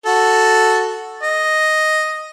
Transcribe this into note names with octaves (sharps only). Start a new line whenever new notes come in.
F#4 A4
D#5